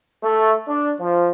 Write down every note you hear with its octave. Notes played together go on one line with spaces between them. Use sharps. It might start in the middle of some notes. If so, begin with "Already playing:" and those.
A3
D4
F3